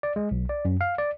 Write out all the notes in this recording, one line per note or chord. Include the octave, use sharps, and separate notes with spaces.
D5
G#3
B1
D5
F#2
F5
D5